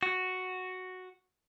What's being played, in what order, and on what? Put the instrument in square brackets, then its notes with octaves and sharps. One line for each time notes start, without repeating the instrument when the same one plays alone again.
[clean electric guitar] F#4